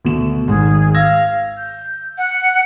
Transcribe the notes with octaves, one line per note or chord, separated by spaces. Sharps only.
D2 B2 E7
G#1 G#2 G#4
F5 E6 G#6 A#6
G6
F#5